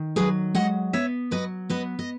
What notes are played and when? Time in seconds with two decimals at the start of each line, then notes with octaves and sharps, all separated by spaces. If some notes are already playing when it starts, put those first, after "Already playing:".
Already playing: D#3
0.16 F#3 G#4 B4
0.55 G#3 D#5 F#5
0.93 B3 C#5 E5
1.31 F#3 B4 D#5
1.70 B3 B4 D#5
1.99 D#5